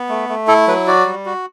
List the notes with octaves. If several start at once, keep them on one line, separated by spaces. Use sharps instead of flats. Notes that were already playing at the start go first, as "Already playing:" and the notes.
Already playing: B3
A3
A3
E4 A4
F#3 B4
F#4 D5
G3
F#4